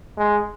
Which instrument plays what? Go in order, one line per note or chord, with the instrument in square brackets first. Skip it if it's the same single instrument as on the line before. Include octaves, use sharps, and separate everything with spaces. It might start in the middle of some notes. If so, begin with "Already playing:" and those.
[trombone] G#3